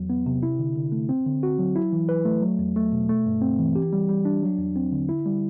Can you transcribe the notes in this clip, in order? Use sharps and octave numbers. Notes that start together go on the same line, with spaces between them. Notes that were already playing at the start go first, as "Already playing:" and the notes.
Already playing: E2 F#3
B3
C3
E4
D3
D3
A3
C4
D3
F#4
F#3
E4
E3
B4
A3
F#3
E2
A3
B2
A3
G2
C4
E3
G4
G3
G3
D4
F#3
E2
C4
D3
E4
G3